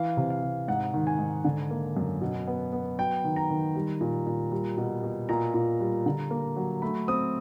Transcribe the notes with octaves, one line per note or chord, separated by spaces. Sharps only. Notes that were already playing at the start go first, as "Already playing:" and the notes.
Already playing: E3 F5
C3
F5
C3
G#2 F#5
D#3
G#5
G#2
D3
A#3
F#2
B2
B3
B3
F#3 G5
D#3
A#5
D#3
G3
A#2
A#2
G3
B2
B2
A#2 A#5
A#2
G3
D3
A#3
F#3
A3 B5
C4 D#6